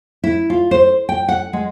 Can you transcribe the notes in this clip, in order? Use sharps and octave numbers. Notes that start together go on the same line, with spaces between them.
E4
F4
C5
G5
F#5
G#3